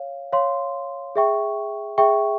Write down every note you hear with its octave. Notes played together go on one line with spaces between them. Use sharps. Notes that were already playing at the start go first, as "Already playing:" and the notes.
Already playing: C#5 F5
C#5 F5 C6
G#4 E5 G5 C#6
G#4 E5 G5 C#6